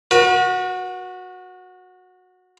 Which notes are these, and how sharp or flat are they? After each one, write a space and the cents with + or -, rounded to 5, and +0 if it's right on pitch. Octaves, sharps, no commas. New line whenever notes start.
F#4 -15 B4 -45